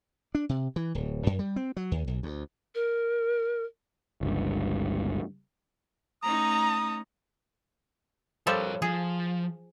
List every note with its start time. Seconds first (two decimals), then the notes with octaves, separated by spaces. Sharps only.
0.35 D4
0.49 C3
0.76 E3
0.95 D1
1.26 F#2
1.39 G3
1.56 C4
1.77 F#3
1.91 D#2
2.08 B1
2.23 D2
2.75 A#4
4.21 G1 C#2 G2
6.23 A3 C#4 D#4 A#5 D#6
8.47 F3 G3 A4 A#4 C#5
8.82 F3 G#4